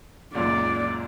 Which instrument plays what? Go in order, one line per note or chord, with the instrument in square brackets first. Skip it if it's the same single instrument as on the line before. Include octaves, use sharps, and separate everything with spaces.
[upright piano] C#2 F#2 A#2 [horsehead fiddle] D5